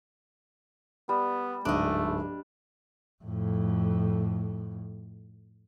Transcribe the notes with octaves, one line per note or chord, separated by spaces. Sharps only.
G3 B3
D1 G#2 A3 D4 D#5
F2 A2